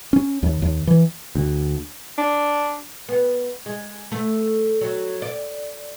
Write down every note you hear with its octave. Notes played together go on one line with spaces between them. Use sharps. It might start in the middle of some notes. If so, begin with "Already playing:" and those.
C#4
D#2
D#2
E3
D2
D4
B3
G#3
A3
F#3
D5